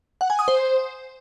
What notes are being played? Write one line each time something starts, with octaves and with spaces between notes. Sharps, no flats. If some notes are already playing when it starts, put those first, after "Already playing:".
F#5
G#5
D#6
C5